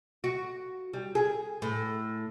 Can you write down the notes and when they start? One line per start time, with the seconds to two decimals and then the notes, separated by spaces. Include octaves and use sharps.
0.24 F#4
0.93 G3
1.15 G#4
1.62 A2